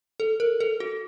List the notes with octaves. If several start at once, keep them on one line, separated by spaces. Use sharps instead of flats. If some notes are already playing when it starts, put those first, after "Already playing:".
A4
A#4
A4
F#4